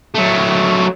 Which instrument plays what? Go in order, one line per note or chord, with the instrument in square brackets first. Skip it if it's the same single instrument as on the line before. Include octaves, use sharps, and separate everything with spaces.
[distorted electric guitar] F#3 A3